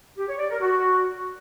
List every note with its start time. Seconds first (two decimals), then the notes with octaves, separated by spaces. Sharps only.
0.17 G4
0.28 C#5
0.39 D5
0.50 A#4
0.61 F#4